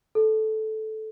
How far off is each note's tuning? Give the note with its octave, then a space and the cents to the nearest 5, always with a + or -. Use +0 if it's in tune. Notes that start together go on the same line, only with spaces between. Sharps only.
A4 -10